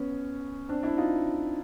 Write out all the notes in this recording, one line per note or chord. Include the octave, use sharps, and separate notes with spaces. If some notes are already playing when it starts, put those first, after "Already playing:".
Already playing: B3 C#4
C4 D4
D4 E4
D#4 F4